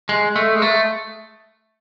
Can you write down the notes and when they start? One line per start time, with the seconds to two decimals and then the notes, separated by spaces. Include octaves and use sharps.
0.09 G#3
0.36 A3
0.55 G#3
0.62 A3